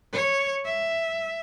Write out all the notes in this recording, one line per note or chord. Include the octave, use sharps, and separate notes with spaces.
C#5
E5